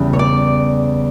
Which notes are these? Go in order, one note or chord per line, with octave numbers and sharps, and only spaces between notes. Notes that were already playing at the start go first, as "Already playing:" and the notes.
Already playing: E2 C#3 G3
C#5
D5